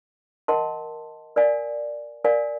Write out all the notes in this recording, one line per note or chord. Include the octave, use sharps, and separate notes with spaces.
A#4 D#5 F#5 A5 C6
A#4 D5 F5 G#5
A#4 D5 F5 G#5